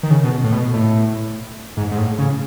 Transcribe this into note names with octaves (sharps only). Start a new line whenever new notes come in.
D#3
C#3
B2
A2
B2
A2
G#2
G#2
A2
C#3